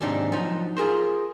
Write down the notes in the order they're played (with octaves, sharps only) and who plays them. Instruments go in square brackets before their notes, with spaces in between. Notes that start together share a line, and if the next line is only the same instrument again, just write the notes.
[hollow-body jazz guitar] D#2 G#2 C3 D4 D#4
F3 F#3 D#4
F4 G#4 A#4 C5